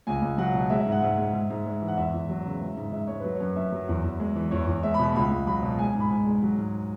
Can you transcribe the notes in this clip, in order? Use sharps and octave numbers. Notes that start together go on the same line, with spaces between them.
C#2 G#5
C#2
F#3 F#5
B2
G#3 E5
E5
G#2
F#5
G#2 E5
G#3
G#2
G#2
G#3
E3
F#5
E2 E5
E2
F#3
C#3
G#3
G#2
G#2 E5
G#3 C#5
F#3 B4
C#5
F#2
F#2 E5
F#3
E2
E2
G#3
E3
E2 C#5
E2
G#3 E5
B5
B2
B5
C#2 B5
C#2
F#3 B5
B2
G#3 G#5
G#5
G#2
B5
G#2 G#5
G#3
F#3
G#2